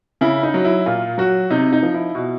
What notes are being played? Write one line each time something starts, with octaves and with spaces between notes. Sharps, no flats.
C#3 E4
D#4
F#3
E4
A#2 F4
F#3 F#4
C3 D#4
D#4
F3
E4
B2